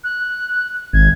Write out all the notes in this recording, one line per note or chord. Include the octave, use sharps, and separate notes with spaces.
F#6
G#1 G#6